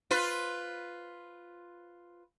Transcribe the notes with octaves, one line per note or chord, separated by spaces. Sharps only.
F4 B4